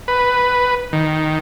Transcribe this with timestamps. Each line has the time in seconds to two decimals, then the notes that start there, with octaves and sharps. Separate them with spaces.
0.08 B4
0.93 D#3